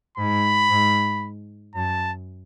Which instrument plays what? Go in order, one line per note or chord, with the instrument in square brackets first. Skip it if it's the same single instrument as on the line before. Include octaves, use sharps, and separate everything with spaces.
[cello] G#2 [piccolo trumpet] B5
[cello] G#2
[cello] F#2 [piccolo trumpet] A5